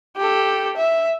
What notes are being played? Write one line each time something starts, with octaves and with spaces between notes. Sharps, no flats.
G4 A4
E5